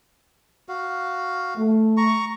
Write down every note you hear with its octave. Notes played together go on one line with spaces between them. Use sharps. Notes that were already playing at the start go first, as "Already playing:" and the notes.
F#4 F5
A3
A#5 C#6